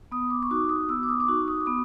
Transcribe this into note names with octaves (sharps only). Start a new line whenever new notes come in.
B3 D#6
D6
C#6
D#4 F#4 D6
D#6
B3 E6
D6
D#6
D6
D#4 F#4 C#6
D#6
D6
B3 D#6